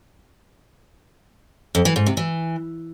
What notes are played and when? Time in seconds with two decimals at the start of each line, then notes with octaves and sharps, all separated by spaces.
1.75 F2
1.85 E3
1.96 G#2
2.06 C3
2.17 E3